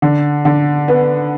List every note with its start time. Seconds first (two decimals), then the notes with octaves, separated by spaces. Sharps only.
0.02 D3
0.45 D3
0.88 B3